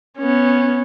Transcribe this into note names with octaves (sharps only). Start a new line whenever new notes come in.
B3 C#4